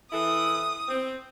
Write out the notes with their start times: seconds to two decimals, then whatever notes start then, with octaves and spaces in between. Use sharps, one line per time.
0.12 E3 E4 A4 D#6
0.88 C4